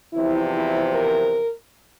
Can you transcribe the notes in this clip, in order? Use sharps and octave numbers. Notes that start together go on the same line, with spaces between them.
E2 C3 F3 E4
E4
A#4